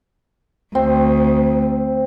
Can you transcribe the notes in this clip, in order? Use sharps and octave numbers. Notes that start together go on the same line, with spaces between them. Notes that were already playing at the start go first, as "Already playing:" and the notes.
D2 C4